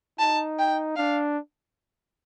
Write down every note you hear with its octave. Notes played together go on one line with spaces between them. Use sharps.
D#4 A5
G5
D4 F5